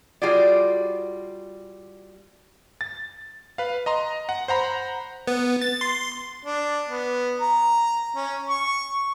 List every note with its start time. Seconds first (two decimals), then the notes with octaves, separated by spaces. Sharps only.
0.22 G3 F4 F#4 G#4 D5
2.81 A6
3.58 B4 F5
3.86 D#5 A#5 C6
4.29 F#5
4.48 C5 F#5 A#5 B5
5.27 B3
5.62 A6
5.81 C6
6.45 D4
6.89 B3
7.41 A#5
8.16 C#4
8.49 C#6